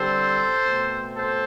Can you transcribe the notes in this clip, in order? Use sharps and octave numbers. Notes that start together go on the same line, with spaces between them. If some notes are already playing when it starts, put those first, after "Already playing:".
Already playing: D3 G3 C4 A4 C5
B2 A3 C4
A4 C5